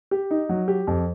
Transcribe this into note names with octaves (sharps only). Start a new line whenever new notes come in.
G4
D#4
F#3
G4
F2